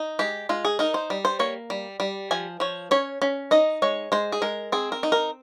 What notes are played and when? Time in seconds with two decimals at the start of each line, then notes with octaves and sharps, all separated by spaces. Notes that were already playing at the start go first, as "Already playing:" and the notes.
Already playing: D#4
0.19 G#3 G4
0.49 G#3 F4
0.65 G#4
0.79 D#4 A#4
0.94 C5
1.10 G3
1.25 C5
1.39 A#3 C#5
1.70 G3
2.00 G3
2.31 F3 G#5
2.60 F3 C#5
2.91 C#4 C#5
3.22 C#4
3.51 D#4 D#5
3.82 G#3 C#5
4.12 G#3 C5
4.32 G#4
4.42 G#3 A#4
4.72 C4 G#4
4.92 A#4
5.03 D#4
5.12 A#4